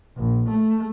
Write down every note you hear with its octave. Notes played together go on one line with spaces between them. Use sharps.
A#1
A3